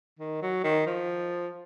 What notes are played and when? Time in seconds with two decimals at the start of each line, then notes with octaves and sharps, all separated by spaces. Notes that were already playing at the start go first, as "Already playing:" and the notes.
0.19 D#3
0.42 F#3
0.64 D#3
0.87 F3